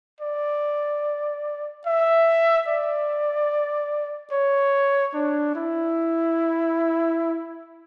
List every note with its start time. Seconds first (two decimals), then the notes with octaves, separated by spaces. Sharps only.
0.21 D5
1.86 E5
2.68 D5
4.32 C#5
5.14 D4
5.55 E4